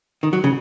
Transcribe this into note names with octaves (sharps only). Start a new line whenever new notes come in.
D#3
F#3
C#3